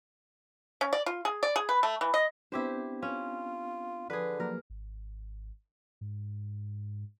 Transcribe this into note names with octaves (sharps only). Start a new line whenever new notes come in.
C#4
D5
F4
G#4
D5
G#4
B4
A3
E3
D#5
B3 C4 D4 E4 G4 C5
C#4 F4
D3 F3 G#4 B4
F3 F#3 A#3 A#4
G#1
G#2